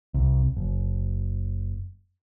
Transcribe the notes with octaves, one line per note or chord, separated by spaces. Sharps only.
C2
F#1